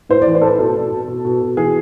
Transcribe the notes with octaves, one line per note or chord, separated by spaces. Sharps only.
A2 C5
E3 D5
C5
A2 A4 B4
B2 A4
B2
B2
B2
B2
B2
E3 G#4